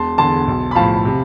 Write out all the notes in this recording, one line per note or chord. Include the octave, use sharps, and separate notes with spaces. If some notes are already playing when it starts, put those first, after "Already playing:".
Already playing: E1 A5 C6
E2 D3 A5 C6
B1
B5
A2 F3 F5 A5
C3